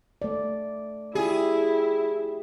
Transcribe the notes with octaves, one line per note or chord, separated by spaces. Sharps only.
A3 D5
E4 F4 G4 G#4